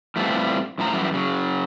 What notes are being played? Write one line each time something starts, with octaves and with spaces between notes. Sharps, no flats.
A2 G3 A3 B3 C4 F4
F#2 A2 F3 A#5
F#2 E3 F#3 G3
C#3 F#3